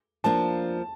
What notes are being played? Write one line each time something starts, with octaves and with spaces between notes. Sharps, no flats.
F3 A#3 D4 A5